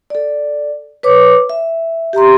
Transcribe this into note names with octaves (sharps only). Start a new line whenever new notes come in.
A4 D5
B4 C#5 D6
E5
G4 E5 A#5 C6